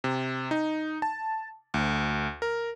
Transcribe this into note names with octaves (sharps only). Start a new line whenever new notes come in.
C3
D#4
A5
D2
A#4